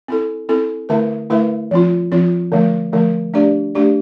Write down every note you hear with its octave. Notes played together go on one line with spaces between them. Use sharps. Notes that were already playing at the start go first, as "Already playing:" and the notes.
C4 E4 A4
C4 E4 A4
D3 A3 E4 B4 E5
D3 A3 E4 B4 E5
F3 C4 F4
F3 C4 F4
D3 F3 A3
D3 F3 A3
A3 D4 G4 D5
A3 D4 G4 D5